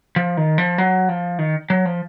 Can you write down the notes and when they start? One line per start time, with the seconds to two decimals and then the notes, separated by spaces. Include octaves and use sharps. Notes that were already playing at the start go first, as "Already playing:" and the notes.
0.16 F3
0.37 D#3
0.58 F3
0.78 F#3
1.09 F3
1.39 D#3
1.70 F#3
1.85 F3